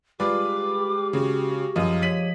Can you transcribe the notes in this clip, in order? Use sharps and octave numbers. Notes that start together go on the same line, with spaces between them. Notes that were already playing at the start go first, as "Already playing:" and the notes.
G#3 F4 G4 B4 D5 D6
C#3 F#4
F#2 F3 D#5
C#5 B6 D#7 F#7